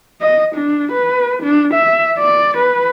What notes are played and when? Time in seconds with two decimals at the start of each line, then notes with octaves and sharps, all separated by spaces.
0.21 D#5
0.55 D4
0.92 B4
1.43 D4
1.74 E5
2.18 D5
2.57 B4